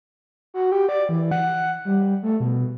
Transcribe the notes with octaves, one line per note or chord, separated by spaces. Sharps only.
F#4
G4
D5
E3
F#5
G3
A3
B2